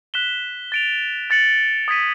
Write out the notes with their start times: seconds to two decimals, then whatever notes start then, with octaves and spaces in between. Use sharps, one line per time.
0.14 F#6 B6 E7 G7
0.72 A6 D7 F7
1.30 F#6 A6 C#7 F#7
1.88 D#6 G#6 B6 D#7